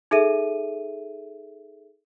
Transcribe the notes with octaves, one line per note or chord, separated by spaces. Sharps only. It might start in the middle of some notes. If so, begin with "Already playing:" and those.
D#4 G#4 A4 E5 D#7